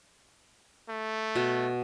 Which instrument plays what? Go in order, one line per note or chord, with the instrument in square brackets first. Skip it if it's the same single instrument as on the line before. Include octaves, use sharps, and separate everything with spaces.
[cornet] A3
[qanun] B2